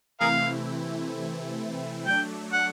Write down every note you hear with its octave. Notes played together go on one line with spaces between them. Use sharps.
C3 E3 A3 C4 E4 G#4 A#4 F5
F#3 A3 D4 G5
F#5